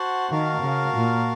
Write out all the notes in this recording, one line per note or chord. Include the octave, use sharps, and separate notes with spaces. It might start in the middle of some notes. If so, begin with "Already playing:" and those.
Already playing: F#4 C5 F#5 A5
D#3 F#4 A#4 F5 A5
C#3
A#2